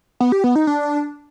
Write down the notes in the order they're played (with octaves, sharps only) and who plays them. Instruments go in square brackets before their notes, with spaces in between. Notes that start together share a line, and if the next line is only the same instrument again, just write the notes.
[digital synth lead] B3
G4
B3
D#4
D4